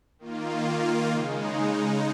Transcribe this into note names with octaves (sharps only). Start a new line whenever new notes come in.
D#3 A#3 F4
C#3 G#3 D#4